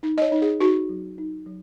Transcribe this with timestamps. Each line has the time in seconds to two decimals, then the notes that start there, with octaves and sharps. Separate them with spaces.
0.03 D#4
0.18 D#5
0.22 C#5
0.32 D#4
0.42 G#4
0.60 D#4 F#4
0.89 F#3
1.18 D#4
1.46 F#3